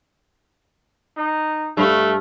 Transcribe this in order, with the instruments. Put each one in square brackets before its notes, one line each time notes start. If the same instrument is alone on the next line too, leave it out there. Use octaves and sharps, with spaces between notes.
[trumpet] D#4
[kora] G2 F5 [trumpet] A3